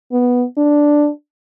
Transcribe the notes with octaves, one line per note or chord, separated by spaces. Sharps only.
B3
D4